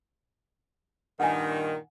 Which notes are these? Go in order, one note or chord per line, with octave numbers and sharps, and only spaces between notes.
G2 A#2 D#3 F#5 G#5